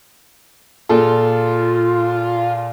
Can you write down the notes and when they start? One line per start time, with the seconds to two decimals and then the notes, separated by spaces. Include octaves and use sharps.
0.89 A#2 F4 G#4 A4